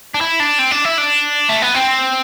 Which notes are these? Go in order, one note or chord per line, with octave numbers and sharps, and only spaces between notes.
D4
E4
D4
C4
D4
E4
D4
A3
B3
C4